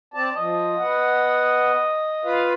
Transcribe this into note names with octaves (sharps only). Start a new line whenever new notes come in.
C4 D5 A5
F3 D#5
B3 F#5
F4 B4 F5